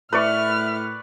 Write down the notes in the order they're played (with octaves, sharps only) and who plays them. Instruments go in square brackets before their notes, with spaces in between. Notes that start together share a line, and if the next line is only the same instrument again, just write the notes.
[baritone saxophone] A2 [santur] B4 D5 C#6 [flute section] E5 [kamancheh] F6